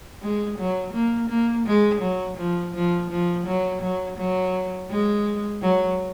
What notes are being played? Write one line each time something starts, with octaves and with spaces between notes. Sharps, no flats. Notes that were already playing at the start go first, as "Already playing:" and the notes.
G#3
F#3
A#3
A#3
G#3
F#3
F3
F3
F3
F#3
F#3
F#3
G#3
F#3